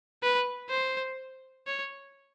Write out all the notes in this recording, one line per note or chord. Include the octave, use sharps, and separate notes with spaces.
B4
C5
C#5